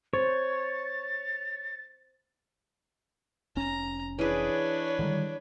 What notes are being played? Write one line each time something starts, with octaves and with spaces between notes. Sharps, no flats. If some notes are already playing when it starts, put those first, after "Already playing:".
C5 C#5 A6
F1 C#4 A#5
E3 D4 G#4 B4 C#5
D3 D#3 G3